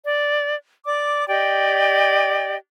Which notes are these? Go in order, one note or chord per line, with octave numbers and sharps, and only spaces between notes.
D5
D5 D6
G4 D5 D#5 G5